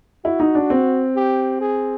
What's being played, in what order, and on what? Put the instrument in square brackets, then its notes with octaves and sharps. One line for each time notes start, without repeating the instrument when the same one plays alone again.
[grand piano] E4 [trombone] F#4
[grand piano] D#4
D4
C4
[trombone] G4
G#4